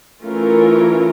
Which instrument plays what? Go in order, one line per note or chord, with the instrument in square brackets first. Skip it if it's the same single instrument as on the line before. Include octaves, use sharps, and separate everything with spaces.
[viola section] E3 A3 C#4 F4 A#4